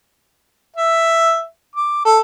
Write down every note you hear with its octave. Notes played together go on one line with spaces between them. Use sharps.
E5
D6
A4